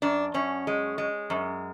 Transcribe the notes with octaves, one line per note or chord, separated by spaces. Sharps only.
F#2 D4
F#2 C#4
G#3
G#3
F#2